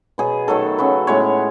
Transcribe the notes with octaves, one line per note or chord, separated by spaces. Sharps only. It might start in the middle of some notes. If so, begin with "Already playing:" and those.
B2 F#3 B3 G#4
D#3 F#3 A3 A4
C#3 F#3 B3
A2 G#3 B3 C#5